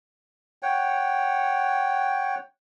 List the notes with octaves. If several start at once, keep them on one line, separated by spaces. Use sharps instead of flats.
C#5 F#5 G5